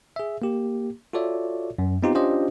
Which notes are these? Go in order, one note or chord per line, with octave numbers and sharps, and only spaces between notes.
G#4 E5
A#3 G4
F4 F#4 A4 C#5 D5 E5
F#2
B3 C4 D#4 F4 G4
C#4 D4 F4 G4 C5 D#5